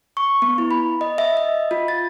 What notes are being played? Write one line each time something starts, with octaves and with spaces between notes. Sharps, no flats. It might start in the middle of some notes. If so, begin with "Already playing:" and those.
C#6
B3
E4
B5
D#5
E5
D#5
F4
A6